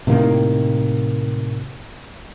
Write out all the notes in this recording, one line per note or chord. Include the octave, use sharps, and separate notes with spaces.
A2 C3 D#3 A#3